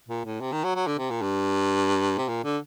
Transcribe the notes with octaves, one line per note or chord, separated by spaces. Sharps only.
A#2
A2
C3
D#3
F#3
F#3
D3
C3
A#2
G2
C3
A#2
D3